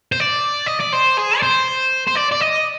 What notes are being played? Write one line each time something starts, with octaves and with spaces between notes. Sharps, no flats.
C5
D5
D#5
D5
C5
G#4
D5
C5
C5
D5
D5
D#5